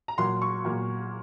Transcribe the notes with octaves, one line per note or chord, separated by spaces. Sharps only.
A#5
A#2 F#3 A#3 C6
C#6
A#2 F#3 A#3